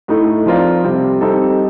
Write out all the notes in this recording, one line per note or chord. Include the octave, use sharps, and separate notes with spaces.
A2 A3 D#4
F3 C4 F4 A#4 D5
C3 G3 C4
G3 C4 D#4 A4